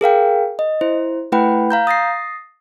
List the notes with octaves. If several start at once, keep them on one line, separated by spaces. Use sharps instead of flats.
G#4 A#4 F5 G5
D#5
E4 C5
A3 E4 B4 F#5 G5 B5
F5 A#5 G6
D#6 A6 A#6 C7